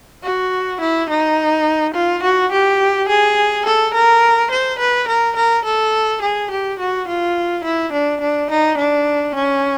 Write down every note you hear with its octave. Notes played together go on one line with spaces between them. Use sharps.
F#4
E4
D#4
F4
F#4
G4
G#4
A4
A#4
C5
B4
A#4
A#4
A4
G#4
G4
F#4
F4
E4
D4
D4
D#4
D4
C#4